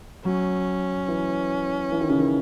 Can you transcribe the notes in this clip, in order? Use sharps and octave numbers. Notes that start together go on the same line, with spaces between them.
F#3 C#4
E3
E3
D#3
C#3
D#3